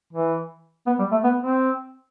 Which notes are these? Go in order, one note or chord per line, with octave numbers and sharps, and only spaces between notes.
E3
B3
G3
A3
B3
C4